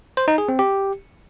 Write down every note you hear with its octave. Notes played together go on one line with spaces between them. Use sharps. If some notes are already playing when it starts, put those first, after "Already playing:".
C5
D#4
G#4
C4
G4